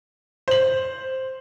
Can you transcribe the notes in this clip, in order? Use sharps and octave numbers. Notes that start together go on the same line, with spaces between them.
C5 F#7